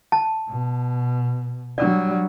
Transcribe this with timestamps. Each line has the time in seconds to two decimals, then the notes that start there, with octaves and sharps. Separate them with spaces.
0.12 A5
0.49 B2
1.78 F#3 G3 D4 D5